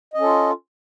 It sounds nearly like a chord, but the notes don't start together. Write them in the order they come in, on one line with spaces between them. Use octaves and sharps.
D#5 C#4 A4 F4